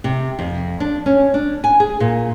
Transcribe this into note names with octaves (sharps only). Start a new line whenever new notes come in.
C3
F2
D4
C#4
D4
G#5
G#4
A#2